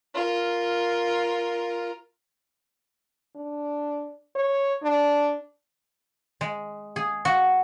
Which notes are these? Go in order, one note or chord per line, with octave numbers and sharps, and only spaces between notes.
F4 A#4
D4
C#5
D4
G#3
G#4
F#4